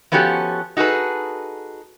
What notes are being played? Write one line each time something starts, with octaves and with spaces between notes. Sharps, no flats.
F3 B3 C#4 F#4 G4 A4
D#4 F#4 G#4 A4 B4